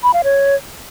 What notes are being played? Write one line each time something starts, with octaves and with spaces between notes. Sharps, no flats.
B5
F5
C#5